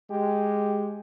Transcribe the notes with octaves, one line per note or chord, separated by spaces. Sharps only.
G#3 G4